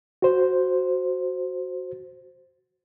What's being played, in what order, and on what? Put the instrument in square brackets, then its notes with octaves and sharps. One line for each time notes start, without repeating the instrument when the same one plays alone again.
[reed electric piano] F#4 C5